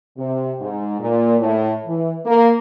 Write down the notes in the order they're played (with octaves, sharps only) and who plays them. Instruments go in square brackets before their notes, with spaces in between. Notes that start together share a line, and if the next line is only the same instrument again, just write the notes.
[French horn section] C3
G#2
A#2
A2
E3
A#3